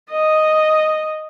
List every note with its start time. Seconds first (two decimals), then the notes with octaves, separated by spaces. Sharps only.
0.11 D#5